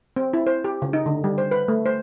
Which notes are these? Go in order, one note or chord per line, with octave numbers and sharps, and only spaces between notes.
C4
E4
C5
G4
C#3
D#4
D3
G3
C5
B4
A3
C5